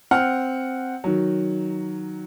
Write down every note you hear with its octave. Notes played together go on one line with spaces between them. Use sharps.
C4 F#5 F6
D#3 F#3